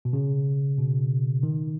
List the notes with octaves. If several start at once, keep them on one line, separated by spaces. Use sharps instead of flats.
B2
C#3
B2
D#3